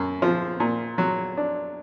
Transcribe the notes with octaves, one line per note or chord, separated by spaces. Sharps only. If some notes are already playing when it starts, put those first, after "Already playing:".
Already playing: F#2
F3
A#2
F#3
D4